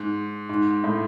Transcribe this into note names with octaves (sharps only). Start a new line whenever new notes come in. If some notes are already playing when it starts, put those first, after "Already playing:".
Already playing: G#2
G#2
A2